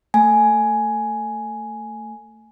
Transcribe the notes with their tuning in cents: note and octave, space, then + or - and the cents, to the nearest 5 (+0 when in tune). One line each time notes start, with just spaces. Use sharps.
A3 +25 G#5 +10